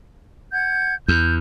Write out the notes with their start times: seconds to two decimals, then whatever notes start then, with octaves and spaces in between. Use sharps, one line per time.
0.52 F#5 G6 G#6
1.08 E2 G6